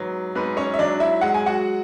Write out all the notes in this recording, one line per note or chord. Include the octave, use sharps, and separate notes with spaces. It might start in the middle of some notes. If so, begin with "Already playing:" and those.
Already playing: G#2 F#3 B3
G#2 B3 B4
C#4 C#5
E5
F#3 D4 D5
E4 E5
G#3 F#5
G#5
F#4 F#5